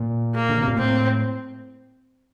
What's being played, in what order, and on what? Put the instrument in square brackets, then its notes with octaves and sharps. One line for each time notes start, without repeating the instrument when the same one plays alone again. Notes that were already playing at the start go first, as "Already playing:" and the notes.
Already playing: [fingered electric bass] A#2
[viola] A#3
[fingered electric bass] D3
C3
A#2
[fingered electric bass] A2 [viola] C4